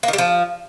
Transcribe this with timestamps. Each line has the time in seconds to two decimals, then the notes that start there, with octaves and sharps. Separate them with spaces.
0.03 A#3
0.08 D#3
0.13 G3
0.18 F3